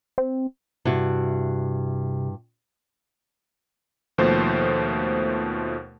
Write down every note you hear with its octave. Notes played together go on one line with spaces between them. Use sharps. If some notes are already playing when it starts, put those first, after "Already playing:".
C4
G2 C3 E4 F#4
D#2 B2 F3 A3 C5